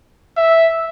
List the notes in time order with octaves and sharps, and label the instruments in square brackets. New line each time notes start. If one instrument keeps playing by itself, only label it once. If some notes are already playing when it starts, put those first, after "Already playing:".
[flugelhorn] E5